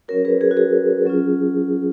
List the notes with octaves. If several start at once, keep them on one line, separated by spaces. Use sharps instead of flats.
F#3 C#4 F#4 A#4 C#5
G#4 B4
G#4
F#4
G#4
F#3 C#4 F4